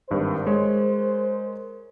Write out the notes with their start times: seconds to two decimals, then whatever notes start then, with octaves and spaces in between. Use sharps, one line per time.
0.10 G#1 G2 A#4 C5
0.46 G#3 C#5